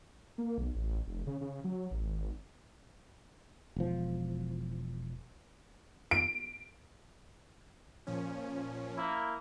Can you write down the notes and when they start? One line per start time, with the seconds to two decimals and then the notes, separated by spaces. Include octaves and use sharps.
0.38 A#3
0.58 B1
0.75 A1
1.07 F1
1.27 C#3
1.41 C#3
1.64 F#3
1.91 A1
2.04 G#1
3.76 E1 F3
6.11 D7
8.07 A#2 F3 C#4
8.97 A#3 E4